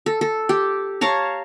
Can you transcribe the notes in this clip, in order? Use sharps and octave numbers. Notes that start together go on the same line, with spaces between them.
A4
A4
G4
C#5 F5 A5 A#5